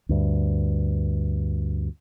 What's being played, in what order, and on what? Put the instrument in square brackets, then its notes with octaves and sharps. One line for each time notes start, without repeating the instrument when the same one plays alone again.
[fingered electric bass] D2 G2